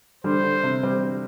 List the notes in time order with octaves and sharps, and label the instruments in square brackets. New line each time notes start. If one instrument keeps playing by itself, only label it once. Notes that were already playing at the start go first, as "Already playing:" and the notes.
[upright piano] D3 G3 [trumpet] C5
[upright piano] D3
C3
G3 C4